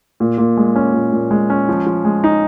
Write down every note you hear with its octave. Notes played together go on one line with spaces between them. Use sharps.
A#2
A#2
G#3
C#4
A#2
A#2
G#3
C#4
F3
F3
G#3
D#4